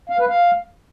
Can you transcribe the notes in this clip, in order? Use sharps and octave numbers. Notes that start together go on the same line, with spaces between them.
F5
B4
F5